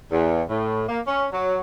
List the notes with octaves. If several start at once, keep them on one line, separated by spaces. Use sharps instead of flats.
E2
A2
A#3
C#4
F#3